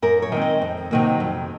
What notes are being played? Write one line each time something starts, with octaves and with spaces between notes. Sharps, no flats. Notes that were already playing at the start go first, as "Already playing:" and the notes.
F#2 A#4
C#5
D#3 G#3 C4
D#5
F2
C3 D#3 F#3 A#3
F2